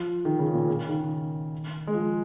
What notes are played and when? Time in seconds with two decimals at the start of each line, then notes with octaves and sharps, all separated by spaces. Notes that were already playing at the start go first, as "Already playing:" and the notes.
Already playing: F3
0.25 D#3
0.39 C#3
0.53 A#2
0.68 C#3
0.89 D#3
1.87 G#3
1.94 F3